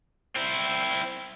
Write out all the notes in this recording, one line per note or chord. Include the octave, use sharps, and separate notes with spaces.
C4 E4